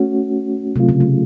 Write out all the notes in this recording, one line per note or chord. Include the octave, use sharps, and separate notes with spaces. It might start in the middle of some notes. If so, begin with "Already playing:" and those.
Already playing: A3 C#4 F#4
C3 F#3 A3 C4 F4
C#3
C#3